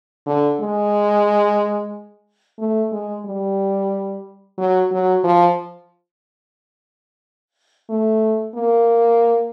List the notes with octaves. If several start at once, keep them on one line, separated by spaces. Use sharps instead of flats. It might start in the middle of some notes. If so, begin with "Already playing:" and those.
D3
G#3
A3
G#3
G3
F#3
F#3
F3
A3
A#3